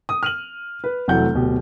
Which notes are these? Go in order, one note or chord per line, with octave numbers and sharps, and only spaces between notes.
D#6
F6 D#7 F#7
B4
F1 E3 F#3 A3 F#5 G6
D1 B2 G4